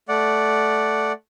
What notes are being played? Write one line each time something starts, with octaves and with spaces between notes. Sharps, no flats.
A3 D5 F#5